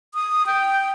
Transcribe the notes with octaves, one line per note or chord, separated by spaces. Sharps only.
D#6
G5